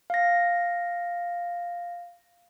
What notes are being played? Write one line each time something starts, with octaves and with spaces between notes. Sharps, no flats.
F5 A#6